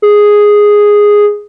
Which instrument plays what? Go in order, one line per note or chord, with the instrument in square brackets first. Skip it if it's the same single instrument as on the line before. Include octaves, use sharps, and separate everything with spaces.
[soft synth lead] G#4